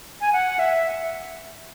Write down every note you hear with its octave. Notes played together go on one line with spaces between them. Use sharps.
G#5
F#5
E5